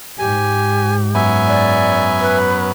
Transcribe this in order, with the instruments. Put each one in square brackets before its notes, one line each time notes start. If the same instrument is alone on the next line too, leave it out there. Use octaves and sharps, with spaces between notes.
[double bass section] G#2 [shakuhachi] G4 [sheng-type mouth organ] G#5
[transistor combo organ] F#2 B3 [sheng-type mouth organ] E5 G#5
[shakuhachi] D5
B4